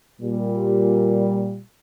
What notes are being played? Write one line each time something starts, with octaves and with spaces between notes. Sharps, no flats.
A#2 G3